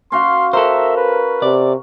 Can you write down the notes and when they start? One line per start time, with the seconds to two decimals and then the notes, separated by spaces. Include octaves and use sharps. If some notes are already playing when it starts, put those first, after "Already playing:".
0.12 C#4 F#4 F5 C6
0.53 A4 A#4 C5 E5
0.97 B4
1.42 C3 D5